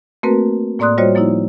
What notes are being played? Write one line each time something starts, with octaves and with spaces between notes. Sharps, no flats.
A3 A#3 C4 F#4 A#4 B4
A2 A#3 D5 C6 D#6 F#6
G3 F4 F#4 C5 C#5 D#5
F3 A#3 D#4 E4